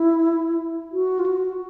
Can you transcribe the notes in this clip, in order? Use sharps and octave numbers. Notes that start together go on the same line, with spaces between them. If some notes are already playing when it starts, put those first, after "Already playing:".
Already playing: E4
F#4
F4
F#4